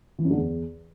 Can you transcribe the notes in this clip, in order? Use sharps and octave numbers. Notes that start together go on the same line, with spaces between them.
E3
F#2
D3
E2